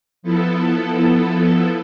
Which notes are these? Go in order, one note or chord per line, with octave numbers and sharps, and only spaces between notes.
F3 B3 E4 A4